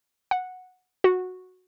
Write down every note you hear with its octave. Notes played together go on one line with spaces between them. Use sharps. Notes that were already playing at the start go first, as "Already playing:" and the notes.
F#5
F#4